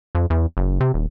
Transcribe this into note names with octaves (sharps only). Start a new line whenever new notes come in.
F2
E2
F#1
C3
D#1